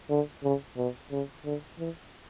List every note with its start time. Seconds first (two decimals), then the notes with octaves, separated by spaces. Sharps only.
0.10 D3
0.44 C#3
0.77 B2
1.11 C#3
1.45 D3
1.79 E3